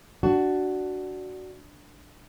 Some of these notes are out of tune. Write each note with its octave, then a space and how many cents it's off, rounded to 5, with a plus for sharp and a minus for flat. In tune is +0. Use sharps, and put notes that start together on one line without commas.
D4 +0 F#4 +10